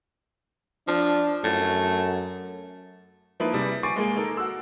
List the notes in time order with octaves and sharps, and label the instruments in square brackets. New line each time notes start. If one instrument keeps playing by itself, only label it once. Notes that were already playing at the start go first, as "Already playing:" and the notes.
[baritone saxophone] F3 [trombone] D4
[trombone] F#2 [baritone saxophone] A3
[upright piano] F3 A#3 D#4 E4 B4
C3 G3 G#4
G#5 C#6 D6 A6 C7 D7
G#3 A#3 G#4
D#4 A4 A#4
F#4 E6